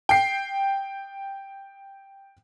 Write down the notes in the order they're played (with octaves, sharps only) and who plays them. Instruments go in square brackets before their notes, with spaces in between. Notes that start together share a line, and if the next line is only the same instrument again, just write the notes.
[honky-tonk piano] G5 C7